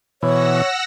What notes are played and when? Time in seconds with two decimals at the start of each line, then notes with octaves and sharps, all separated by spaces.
0.23 B2 E3 C#5 F#5 E6 A#6